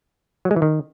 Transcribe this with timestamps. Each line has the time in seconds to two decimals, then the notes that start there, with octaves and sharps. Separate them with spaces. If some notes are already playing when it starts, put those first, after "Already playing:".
0.45 F#3
0.51 G#3
0.56 E3
0.62 D#3